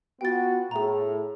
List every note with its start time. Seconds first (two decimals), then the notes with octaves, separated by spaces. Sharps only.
0.21 B3 F4 F#4 G5 A6
0.71 A2 G#4 A#5